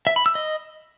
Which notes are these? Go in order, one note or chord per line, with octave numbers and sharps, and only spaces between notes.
E5
B5
E6
D#5